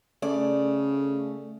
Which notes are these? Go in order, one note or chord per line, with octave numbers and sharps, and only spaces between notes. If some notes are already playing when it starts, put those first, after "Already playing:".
C#3 A3 D5